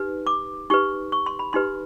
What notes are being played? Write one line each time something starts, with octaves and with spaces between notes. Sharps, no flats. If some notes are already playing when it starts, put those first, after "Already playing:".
Already playing: D#4 G4 B4
D6
D#4 G4 B4 C#6
C#6
C6
B5
D#4 G4 B4 C6